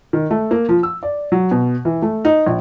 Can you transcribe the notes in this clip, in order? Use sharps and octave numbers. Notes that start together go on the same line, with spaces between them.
D#3
A3
A#3
F3
E6
D5
F#3
B2
E3
A3
D#4
A#1